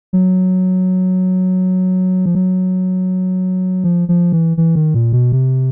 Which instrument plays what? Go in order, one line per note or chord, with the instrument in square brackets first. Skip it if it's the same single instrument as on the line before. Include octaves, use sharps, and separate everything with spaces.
[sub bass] F#3
F3
F#3
F3
F3
E3
E3
D#3
A#2
B2
C3